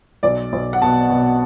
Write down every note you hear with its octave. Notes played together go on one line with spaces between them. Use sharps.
B1 D5
B1
F#5
B2 A5
B2